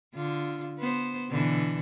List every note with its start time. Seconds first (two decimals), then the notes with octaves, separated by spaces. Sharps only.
0.15 D3 F4
0.79 B3 C5
1.29 B2 D3 E3